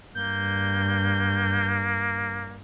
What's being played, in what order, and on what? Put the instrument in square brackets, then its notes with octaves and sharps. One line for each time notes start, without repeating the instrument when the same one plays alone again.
[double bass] G2 [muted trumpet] A#3 [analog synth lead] G6